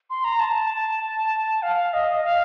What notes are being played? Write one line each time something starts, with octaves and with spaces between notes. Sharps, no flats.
C6
A#5
A5
F5
D#5
F5